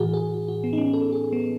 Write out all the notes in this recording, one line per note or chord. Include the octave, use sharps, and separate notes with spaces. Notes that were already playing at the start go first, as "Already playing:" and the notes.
Already playing: A2 E3 F#4 G#4
G#4
F#4
F#4
B3
D#4
C#4
A4
G#4
B3